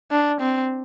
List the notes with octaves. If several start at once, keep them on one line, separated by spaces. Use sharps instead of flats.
D4
C4